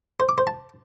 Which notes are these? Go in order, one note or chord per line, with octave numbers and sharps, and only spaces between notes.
C5
D6
C5
A5